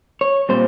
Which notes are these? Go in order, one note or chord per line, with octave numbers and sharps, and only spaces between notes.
C#5
A#2 G3 C4 C5